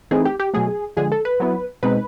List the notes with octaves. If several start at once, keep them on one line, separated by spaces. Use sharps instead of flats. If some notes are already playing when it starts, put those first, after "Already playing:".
E3 A3 C4 D#4 G#4
G4
G4
B2 F#3 A3 G#4
D3 F3 G#3 G#4
A4
B4
F#3 B3 E4
B2 G#3 C4 D#4 B4